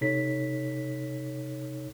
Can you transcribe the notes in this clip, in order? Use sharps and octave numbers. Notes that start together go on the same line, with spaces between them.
C3 D#4 A4 C#5 B6